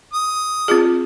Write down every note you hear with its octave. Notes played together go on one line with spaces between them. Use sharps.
D#6
C4 F4 G#4